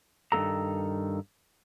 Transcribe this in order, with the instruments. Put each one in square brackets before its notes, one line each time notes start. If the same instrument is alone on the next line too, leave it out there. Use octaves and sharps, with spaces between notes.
[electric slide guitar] G2 D#3 A#3 A4 A#5